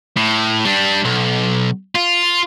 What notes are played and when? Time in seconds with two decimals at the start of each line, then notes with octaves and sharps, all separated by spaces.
0.17 A2
0.65 G3 D4
1.04 B1
1.95 F4